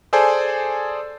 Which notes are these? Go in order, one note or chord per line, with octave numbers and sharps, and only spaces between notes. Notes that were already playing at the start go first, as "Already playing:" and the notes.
G#4 A4 C5 D5 G#5 A5